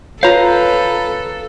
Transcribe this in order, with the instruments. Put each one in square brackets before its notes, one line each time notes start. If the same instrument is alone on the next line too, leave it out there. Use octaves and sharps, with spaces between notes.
[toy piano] F4 C#5 [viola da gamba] A4 [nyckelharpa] B4 [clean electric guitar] F5 A#5